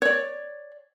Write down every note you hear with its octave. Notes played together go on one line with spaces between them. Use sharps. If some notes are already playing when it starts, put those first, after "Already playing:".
C#5 D5